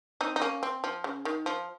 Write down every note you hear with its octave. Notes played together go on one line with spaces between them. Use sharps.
C4 D#4
D#4
A#3 C#4
C4
F3
C#3
D#3
F3